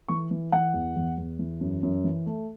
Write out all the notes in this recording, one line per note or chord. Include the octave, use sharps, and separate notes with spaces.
E3 C#6
E3
E3 F#5
E2
E2
E2
E3
F#2
F#2
E3
A3